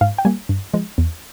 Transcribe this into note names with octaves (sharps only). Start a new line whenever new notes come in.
G#2 F5
G5
G3 A#3 G#5
G2
F3 G#3
E2